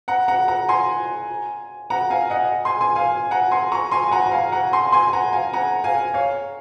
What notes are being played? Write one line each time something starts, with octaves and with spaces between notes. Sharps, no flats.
F#5 A#5
F#5 A#5
F#5 A#5
G#5 C6
F#5 A#5
F5 G#5
D#5 F#5
G#5 C6
G#5 C6
F5 G#5
F#5 A#5
G#5 C6
A#5 C#6
G#5 C6
G#5
F#5 A#5
A#5
F5 G#5
F#5 A#5
G#5 C6
G#5 C6
G#5
F#5 A#5
F5 G#5
F#5 A#5
F5 G#5
C#5 F5